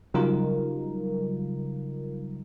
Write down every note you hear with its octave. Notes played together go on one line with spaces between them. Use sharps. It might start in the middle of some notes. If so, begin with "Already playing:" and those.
C#3 F#3 G3 D#4 F4 A#4